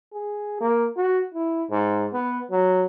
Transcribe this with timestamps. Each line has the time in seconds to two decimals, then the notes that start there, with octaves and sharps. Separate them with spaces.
0.13 G#4
0.61 A#3
0.97 F#4
1.34 E4
1.70 G#2
2.13 B3
2.51 F#3